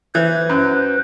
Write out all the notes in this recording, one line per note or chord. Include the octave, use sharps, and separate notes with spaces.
E3 B4 C5
F#2